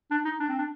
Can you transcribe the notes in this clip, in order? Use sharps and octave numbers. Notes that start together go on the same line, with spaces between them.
D4
D#4
D4
C4
D4